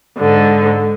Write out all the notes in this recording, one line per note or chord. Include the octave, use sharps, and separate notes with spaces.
G#2 D3